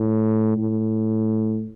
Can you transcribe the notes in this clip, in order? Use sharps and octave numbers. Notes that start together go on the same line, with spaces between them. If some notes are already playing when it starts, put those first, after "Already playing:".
Already playing: A2
A2